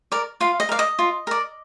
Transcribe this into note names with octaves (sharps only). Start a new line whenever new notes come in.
A#4 D5
F4 F5
D#5
A#4 D5 F5
D#5
F4
A#4 D5